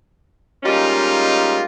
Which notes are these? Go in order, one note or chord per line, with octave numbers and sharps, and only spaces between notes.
G3 G#3 A#3 C#4 D#4 F4